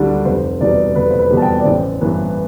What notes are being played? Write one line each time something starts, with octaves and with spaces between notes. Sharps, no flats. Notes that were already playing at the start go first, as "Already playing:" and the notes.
Already playing: D2 D3 G3 D4
F1 C5
E2 B2 G3 D5
F1 B4
C5
B4
E2 B2 G3
A5
G5
D5
A1 C5
G2 E3 B3